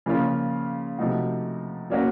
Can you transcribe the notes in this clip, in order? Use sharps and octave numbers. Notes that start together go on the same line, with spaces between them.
C#3 F3 A#3 C#4 F4
C3 F3 A3 D#4 F#4
F#3 A#3 C#4 F#4